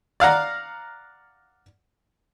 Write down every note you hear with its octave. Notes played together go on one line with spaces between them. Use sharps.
D5 F5 F#5 A#5